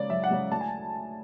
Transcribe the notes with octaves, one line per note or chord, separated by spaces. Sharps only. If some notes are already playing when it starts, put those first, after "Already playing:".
Already playing: C#3 G#3 D5
F#2 E5
F#5
C#3 G#3
D2 A5
G#5